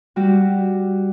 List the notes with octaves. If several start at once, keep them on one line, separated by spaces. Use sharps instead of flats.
G3 F#4 G4